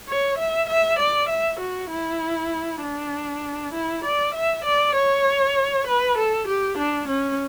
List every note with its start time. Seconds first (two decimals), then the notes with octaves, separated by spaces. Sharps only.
0.08 C#5
0.38 E5
0.69 E5
0.99 D5
1.29 E5
1.60 F#4
1.91 E4
2.82 D4
3.73 E4
4.04 D5
4.35 E5
4.65 D5
4.95 C#5
5.87 B4
6.18 A4
6.48 G4
6.78 D4
7.08 C#4